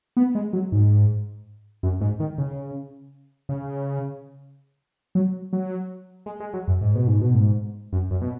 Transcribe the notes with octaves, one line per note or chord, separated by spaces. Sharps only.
B3
G#3
F#3
G#2
F#2
G#2
D#3
C#3
C#3
F#3
F#3
G#3
G#3
F#3
F#2
G#2
B2
G#2
B2
G#2
F#2
F#2
B2